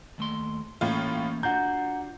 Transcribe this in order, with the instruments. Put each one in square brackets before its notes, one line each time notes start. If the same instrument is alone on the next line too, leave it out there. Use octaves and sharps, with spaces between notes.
[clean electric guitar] D#2 A3 C6
[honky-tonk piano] A2 F4 [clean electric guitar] E3 A#3 C#4
[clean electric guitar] D4 F4 F#4 [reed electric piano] F#5 A#5 [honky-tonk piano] G6